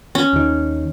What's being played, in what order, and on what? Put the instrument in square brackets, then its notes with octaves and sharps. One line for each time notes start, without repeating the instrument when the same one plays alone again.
[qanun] C#4
[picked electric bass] D#2 D#3